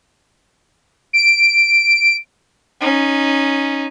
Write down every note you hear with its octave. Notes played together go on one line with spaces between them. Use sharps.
D7
C#4 D#4